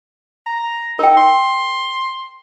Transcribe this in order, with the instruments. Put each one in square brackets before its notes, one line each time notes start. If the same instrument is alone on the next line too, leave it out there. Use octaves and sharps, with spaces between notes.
[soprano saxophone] A#5
[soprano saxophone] D#4 [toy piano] A#4 G5
[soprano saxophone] C6